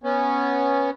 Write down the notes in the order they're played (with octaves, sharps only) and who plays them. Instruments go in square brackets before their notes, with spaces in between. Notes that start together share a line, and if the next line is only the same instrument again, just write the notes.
[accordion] B3 C#4